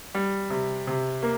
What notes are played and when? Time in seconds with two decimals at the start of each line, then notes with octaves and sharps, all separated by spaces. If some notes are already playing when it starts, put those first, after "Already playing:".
0.15 G3
0.50 C3
0.87 C3
1.23 A#3